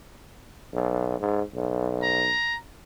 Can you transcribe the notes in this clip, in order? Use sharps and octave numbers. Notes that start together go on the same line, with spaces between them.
B1
G#2
B1
A#5